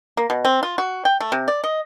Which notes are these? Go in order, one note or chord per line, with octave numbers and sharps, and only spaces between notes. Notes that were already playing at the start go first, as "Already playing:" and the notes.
A#3
B2
C4
F4
F#4
G5
A3
C3
D5
D#5